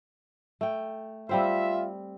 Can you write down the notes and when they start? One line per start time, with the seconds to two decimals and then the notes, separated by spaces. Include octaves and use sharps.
0.61 A3 G5
1.29 G3 C4 F4 C5 E5